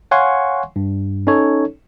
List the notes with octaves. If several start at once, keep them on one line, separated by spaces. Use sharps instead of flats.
C#5 F5 F#5 G#5 C6 C#6
G2
C#4 D#4 A4 C#5